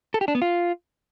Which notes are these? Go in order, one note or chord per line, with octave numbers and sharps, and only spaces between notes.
A4
G4
D4
B3
F4